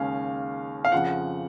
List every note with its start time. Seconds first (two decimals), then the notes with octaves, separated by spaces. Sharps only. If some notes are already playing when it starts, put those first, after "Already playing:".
Already playing: D#2 C#3 G#3 C#4 F5
0.85 F5
0.92 F2 C#3 F3 F#5